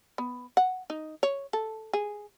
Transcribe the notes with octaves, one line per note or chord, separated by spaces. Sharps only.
B3
F#5
D#4
C#5
A4
G#4